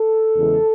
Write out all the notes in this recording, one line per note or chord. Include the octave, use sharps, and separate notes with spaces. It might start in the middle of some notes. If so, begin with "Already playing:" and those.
Already playing: A4
E2 C#3 E3 G#3